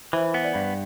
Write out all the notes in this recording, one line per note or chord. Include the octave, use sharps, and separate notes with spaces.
E3 C5 E5
B3
B4 D5
G2